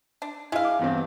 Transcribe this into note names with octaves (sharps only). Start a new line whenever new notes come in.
D4
G#3 E4 F5
D6
E2 G2 C4